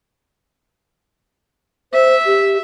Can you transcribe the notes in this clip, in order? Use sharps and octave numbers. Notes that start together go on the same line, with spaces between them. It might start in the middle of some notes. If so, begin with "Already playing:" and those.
C5 E5
G4